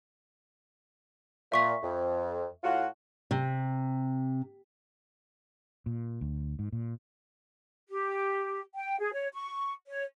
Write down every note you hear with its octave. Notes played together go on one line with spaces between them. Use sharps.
A#2 E5 C#6 B6
F2
A2 F4 F#4
C3
A#2
D2
G#2
A#2
G4
G5
G#4
C#5
C#6
C#5